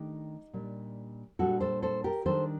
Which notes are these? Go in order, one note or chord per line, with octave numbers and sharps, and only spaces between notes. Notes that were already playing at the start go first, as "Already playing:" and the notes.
Already playing: D#3 A3 D4 D#4 G4
A#2 G3 D4
A#2 G3 D4 F#4 A4
A4 C5
A4 C5
G4 A#4
D#3 G3 D4 A4 C5